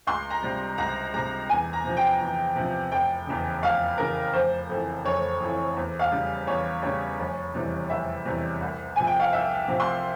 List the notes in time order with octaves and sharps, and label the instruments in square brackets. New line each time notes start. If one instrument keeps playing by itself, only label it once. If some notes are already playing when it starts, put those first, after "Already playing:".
[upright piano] C#2 C6
A#5
C3 G3
C#2 A#5
C3 G3 A#5
E2 G#5
A#5
C3 F3
G5
E2
C3 F3
F1 G5
E2 C#3
F1 F5
E2 C#3 A#4
F1 C5
F2 E3
F1 C#5
F2 E3
E2
F5
C#3 G3
E2 C#5
C#3 G3 C#5
F1
E2 C3 E3 G3
F1 E5
E2 C3 E3 G3
C2
C3 F3 G#5
G5
F5
C2 E5
C3 F3
C6